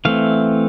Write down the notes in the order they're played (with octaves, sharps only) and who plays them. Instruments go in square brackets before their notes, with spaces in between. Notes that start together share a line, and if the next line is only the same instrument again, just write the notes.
[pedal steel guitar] E3 A3 C4 F5